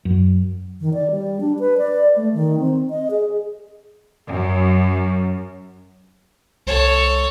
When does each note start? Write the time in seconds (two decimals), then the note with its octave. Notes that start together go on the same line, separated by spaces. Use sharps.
0.05 F#2
0.80 D#3
0.94 D5
1.11 G3
1.40 D4
1.59 B4
1.77 D5
2.16 A3
2.34 D#3
2.59 C4
2.90 D#5
3.11 G#4
4.27 F#2
6.67 C2 A4 C#5